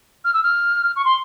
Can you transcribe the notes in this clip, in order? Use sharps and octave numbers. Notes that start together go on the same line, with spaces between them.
F6
E6
F6
C#6
C6